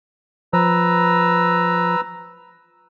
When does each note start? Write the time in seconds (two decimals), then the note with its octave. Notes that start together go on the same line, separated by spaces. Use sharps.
0.53 F3 B4 A#5 E6